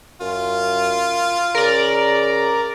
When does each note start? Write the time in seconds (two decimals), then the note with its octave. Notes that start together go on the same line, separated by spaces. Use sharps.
0.21 F#2 F4
1.55 C#3 A#4 D5